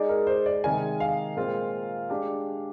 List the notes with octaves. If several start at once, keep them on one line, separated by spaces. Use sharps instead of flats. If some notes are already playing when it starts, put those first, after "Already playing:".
Already playing: G#3 D#4 G#4 D5
A#4
C5
D5
C3 D#3 G#3 D#4 A#4 G#5
F5
A#2 G#3 C4 F4 A#4
G#3 D4 G4